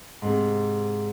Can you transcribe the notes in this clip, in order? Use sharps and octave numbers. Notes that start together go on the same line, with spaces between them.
G#2 C3